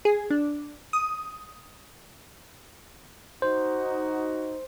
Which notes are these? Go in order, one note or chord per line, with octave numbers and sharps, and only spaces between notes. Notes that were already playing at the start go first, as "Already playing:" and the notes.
G#4
D4
D#6
D#4 F#4 C5